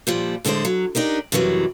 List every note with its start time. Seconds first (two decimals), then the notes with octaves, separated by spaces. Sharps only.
0.07 A#2 F3 G3
0.45 A2 D3 G#3 G#4 C5
0.65 F#3
0.95 D4 D#4 G4 A#4
1.32 F#2 C3 E3 F#3 G3